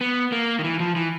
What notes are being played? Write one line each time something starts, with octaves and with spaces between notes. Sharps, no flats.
B3
A#3
D#3
E3
F3
E3